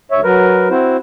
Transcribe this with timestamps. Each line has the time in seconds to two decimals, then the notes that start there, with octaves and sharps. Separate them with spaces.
0.11 D2 C#5 E5
0.24 F#3 A#4 B4
0.70 C4 E4 F#4 C5